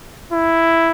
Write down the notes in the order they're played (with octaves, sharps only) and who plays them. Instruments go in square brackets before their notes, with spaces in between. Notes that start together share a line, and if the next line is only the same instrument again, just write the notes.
[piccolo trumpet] E4